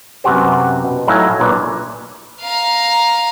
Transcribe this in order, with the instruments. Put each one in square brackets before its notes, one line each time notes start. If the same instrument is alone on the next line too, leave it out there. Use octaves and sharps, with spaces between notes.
[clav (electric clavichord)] F#2 C3 B3 F#4 G4 C5
B2
A2 F#3 D#4 E5 F5 G#5
B1 A#2 D4 B4 C#5 D5
[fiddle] F5 A#5